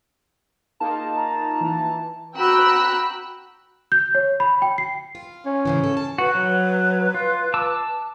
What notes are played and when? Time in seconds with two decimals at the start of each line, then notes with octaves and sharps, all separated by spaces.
0.80 A#3 D#4 F4 G#4 A5
1.16 A#5
1.61 E3
2.36 F#4 G5 A#5 B5 E6 F#6
3.92 G6
4.15 C#5
4.40 B5
4.62 G5
4.78 C7
5.15 F4
5.46 C#4
5.65 G#2 C#3 E3
5.84 A4
5.97 A5
6.18 F#4 B4
6.35 F#3
7.14 F4
7.54 A5 D6 E6